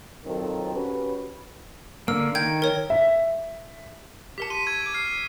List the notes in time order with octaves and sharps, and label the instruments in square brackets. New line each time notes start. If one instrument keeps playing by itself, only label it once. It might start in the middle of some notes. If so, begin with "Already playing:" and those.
[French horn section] F2 D#3 F#3 C4 A4 A#4
C#4 F#4 G4 B4
[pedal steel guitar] D3 A#3 [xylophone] E6
[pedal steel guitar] D#3 [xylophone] G5 G6 G#6
[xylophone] A#4 C#5
[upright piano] E5
[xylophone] G4 A#4 A5 [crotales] B6 C#7
[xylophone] C6 [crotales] B6 D#7
[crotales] C#6 E6 G#6
[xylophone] D6 D7
[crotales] F6 C7